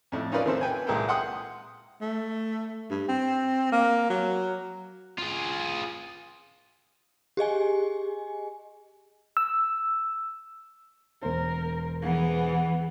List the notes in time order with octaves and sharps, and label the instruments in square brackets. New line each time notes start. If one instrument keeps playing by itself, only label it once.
[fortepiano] F2 A2
C#4 D#4 F4 A#4 B4 D5
A1 D#3 B3 C4 A4 C5
B4 G5 G#5
C2 A#2 G#3 A4 A#4 G5
F#5 G5 C6 D#6 F#6
[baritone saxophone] A3
G2
C4
A#3
F#3
[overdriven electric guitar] F4 G#4
[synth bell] G4 G#4 D#5 G#5
[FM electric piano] E6
[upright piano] E1 C5 [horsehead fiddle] A#4
[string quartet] E3 [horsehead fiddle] B3 G#4